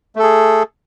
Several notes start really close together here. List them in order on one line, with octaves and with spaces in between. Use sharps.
A3 A4 G#4